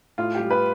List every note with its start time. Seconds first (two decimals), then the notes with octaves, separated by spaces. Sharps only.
0.18 A2 F4
0.35 G3 G4
0.51 B4